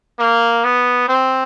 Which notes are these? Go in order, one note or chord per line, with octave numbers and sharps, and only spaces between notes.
A#3
B3
C4